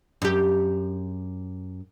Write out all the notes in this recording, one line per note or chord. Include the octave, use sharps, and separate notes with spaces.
F#2 G4